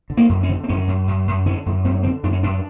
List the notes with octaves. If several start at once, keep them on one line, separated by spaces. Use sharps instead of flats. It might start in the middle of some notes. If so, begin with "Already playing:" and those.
D3
A#3
F#2
C#4
D3
C4
F#2 C#4
F#2
F#2
F#2
D3 C#4
F#2
F#2 C4
C#4
D3 C4
F#2 D4
C#4
F#2 D4